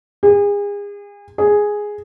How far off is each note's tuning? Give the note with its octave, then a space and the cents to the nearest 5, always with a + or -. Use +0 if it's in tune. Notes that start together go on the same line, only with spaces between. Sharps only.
G#4 -35
G#4 +0